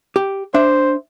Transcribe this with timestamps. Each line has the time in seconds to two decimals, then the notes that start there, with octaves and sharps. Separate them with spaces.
0.16 G4
0.54 D4 C5 E5